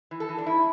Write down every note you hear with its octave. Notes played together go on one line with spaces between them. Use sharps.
E3
A4
E3
D4
G2 E4